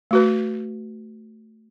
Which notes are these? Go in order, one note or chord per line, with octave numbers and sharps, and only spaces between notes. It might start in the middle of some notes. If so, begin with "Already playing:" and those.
A3 F#4 B4